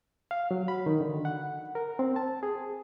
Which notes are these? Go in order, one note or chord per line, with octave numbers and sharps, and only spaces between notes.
F5
F#3
B5
D#3
D3
F#5
A#4
C4
A5
G#4